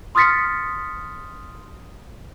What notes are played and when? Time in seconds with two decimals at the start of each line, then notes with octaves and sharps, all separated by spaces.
0.15 C6 D#6 F6 A6 B6 C#7